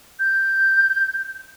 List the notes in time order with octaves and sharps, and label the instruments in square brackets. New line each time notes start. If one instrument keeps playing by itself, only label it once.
[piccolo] G6